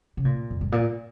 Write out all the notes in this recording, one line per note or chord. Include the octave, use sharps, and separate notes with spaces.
C#3
A#2
F2
G#2
A#2